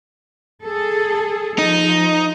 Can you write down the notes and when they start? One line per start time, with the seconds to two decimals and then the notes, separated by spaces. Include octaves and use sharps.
0.63 G#4 A4
1.58 F3 D#4